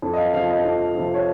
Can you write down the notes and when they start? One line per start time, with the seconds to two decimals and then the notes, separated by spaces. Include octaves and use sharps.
0.02 F2
0.13 D#5
0.18 F5
0.33 C3 F3 F5
0.50 D#5
0.64 F2
0.95 C3 F3
1.14 C#5